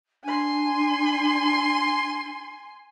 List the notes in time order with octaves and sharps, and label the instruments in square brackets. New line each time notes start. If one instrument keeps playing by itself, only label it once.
[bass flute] D4 [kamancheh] G#5 C6